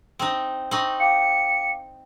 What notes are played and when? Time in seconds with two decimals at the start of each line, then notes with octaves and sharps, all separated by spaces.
0.19 C4 D#4
0.71 C4 D#4 C#6 F#7
1.00 F5 G5 D6 C#7